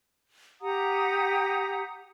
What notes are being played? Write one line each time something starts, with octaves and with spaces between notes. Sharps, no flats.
G4 F#5 A#5 D#6